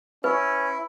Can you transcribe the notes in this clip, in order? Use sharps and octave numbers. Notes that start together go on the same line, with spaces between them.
C#4 E4 B4